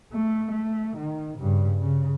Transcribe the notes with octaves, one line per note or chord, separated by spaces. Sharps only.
A3
A3
D#3
G2 C#3
C#3